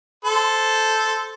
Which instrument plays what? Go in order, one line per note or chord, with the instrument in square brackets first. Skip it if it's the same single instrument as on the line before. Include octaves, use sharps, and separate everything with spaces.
[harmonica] A4 C5